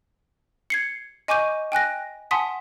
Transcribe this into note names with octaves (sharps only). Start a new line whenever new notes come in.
G#6 C7 C#7
D#5 G#5 C#6 D6 G6 D#7
G5 G#5 F#6 A#6
F#5 G#5 A5 C6 D#6 B6